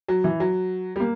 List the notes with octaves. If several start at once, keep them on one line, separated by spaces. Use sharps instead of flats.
F#3
E3
F#3
G3
A#3